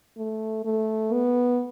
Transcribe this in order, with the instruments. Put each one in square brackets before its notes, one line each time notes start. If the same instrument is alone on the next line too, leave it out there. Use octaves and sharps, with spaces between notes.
[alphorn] A3
A3
B3